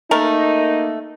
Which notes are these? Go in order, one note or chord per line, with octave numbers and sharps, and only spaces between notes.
A3 A#3 D#4 A#4